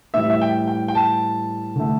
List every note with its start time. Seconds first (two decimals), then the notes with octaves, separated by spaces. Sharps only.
0.14 A2 E3 G3 E5
0.30 E5
0.41 G5
0.67 G5
0.88 G5
0.95 A5
1.76 D3 A3